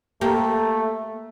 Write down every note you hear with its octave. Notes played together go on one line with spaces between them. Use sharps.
A3 A#3 G4